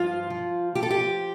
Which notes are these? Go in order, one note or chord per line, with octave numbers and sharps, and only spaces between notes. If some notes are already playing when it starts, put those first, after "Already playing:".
Already playing: G2 F3 F4
F3
F3 G4
A4
G4